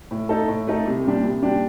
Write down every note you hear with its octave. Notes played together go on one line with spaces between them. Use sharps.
A2
A3 D#4 A4
A2
A3 D#4 A4
C2
A#2 G3 D4 G4
C2
A#2 G3 D4 G4